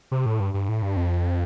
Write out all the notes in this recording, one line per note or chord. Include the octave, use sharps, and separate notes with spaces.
C3
A2
G2
G2
A2
G2
F2